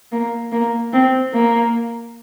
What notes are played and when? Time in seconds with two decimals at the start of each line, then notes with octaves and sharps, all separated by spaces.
0.12 A#3
0.52 A#3
0.93 C4
1.34 A#3